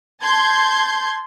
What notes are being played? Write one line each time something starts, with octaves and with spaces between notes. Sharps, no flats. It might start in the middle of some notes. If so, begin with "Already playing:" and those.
A5 C6 G6 G#6